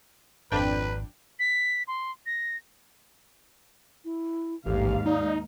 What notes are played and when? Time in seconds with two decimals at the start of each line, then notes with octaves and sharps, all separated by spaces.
0.52 G#1 F2 D4 B4 G5
1.39 B6
1.88 C6
2.26 A#6
4.05 E4
4.66 A1 D#2 G#2 G4 F5
5.06 D#4 D5